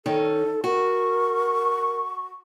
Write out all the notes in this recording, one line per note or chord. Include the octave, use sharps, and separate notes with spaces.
D#3 C#4 D#4 A4
F#4 A#4 C#6